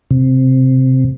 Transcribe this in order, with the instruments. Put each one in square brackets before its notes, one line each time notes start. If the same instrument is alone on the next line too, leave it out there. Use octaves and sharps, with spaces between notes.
[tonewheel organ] C3